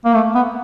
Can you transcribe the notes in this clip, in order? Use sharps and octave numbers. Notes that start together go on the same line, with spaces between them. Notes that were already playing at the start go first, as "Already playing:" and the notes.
A#3
A3
B3